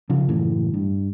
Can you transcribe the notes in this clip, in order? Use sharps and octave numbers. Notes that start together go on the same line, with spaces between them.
C#3 F3
F#1 A2 E3
G2